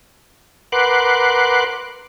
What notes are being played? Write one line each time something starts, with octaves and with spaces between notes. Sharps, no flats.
A#4 B4 F#5 C6 D6 F#6